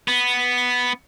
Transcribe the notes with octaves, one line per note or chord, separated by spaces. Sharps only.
B3